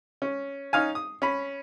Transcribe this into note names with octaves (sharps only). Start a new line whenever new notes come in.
C#4
C#4 D#4 F5 G#5
D#6
C#4 B5